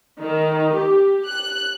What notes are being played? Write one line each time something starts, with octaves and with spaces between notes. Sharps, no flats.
D#3
G4
F#6